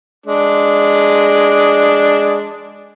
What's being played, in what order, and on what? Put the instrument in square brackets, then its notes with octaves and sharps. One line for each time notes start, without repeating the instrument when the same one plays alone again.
[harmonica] G#3 D4